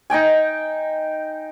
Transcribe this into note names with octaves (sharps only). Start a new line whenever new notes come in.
D#4 D#5 G5 G#5